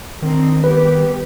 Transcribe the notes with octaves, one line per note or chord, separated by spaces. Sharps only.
D#3 C4 D4 D#4
G3 B3 G4 B4